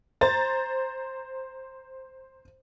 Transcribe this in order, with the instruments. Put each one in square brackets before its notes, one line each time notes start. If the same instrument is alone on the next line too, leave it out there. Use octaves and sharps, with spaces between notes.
[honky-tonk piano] C5 A#5 A6